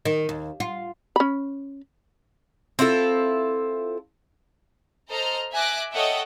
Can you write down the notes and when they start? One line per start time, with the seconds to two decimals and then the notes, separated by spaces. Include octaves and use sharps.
0.05 D#3
0.29 D#2
0.60 F4
1.16 C#4 B5
2.79 C4 E4 F4 A4
5.09 A4 C5 D#5 A#5 F6
5.52 E5 G#5 D6 F#6 A#6
5.92 A4 C#5 D#5 E5 F#5 G5